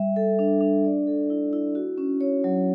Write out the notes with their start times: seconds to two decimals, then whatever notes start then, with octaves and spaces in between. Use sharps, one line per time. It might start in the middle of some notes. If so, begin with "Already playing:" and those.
Already playing: G3 E5
0.16 A4
0.39 D4
0.61 D4
0.85 D5
1.07 A4
1.30 E4
1.53 E4
1.75 F#4
1.98 C#4
2.21 C#5
2.44 F#3